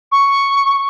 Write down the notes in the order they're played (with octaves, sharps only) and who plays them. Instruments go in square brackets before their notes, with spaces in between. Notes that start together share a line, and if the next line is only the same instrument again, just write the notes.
[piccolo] C#6